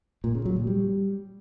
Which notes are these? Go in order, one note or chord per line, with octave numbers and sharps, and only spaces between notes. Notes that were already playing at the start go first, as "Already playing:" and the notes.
A#2
C#3
F#3
A#2
G3